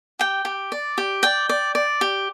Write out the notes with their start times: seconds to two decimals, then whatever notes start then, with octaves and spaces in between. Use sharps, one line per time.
0.19 G4 G5
0.45 G4
0.72 D5
0.98 G4
1.23 D5 G5
1.49 D5
1.75 D5
2.01 G4